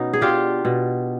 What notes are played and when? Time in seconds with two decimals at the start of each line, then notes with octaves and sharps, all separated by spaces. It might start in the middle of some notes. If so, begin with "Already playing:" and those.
Already playing: B2 C#4 D#4
0.13 G#4
0.21 D4 F4 G4
0.65 B2